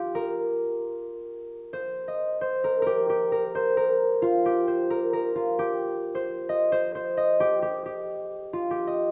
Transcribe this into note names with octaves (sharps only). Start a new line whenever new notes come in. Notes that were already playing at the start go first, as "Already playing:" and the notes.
Already playing: F4 G4
A#4
C5
D#5
C5
A#4
G4 A#4
G4
A#4
C5
A#4
F4
G4
C5
A#4
A#4
F4
G4
C5
D#5
C5
C5
D#5
G4
G4
G4
F4
G4
D#5